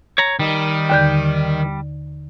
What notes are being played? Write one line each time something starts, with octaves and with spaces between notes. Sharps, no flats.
C#5 A#5
D#3 G3
D#2 D3 G6